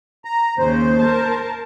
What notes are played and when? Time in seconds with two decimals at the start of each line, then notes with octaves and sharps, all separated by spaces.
0.25 A#5
0.59 D#2 C#3 C5
0.98 A#4 A5